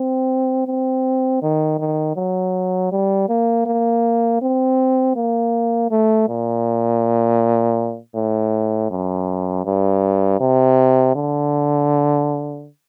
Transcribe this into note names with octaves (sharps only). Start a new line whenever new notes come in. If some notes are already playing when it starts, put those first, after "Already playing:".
Already playing: C4
C4
D#3
D#3
F#3
G3
A#3
A#3
C4
A#3
A3
A#2
A2
F#2
G2
C3
D3